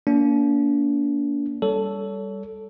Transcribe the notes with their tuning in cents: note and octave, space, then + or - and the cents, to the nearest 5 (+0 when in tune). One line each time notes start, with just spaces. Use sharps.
A#3 +0 D4 -40
G3 +10 A4 +0 C#5 +30